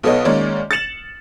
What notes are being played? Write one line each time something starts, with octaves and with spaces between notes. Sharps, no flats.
B1 B3 A4 C#5 D#5
D#3 G#3 A#3 C#4 C#5 D5
A6 C#7 E7 F#7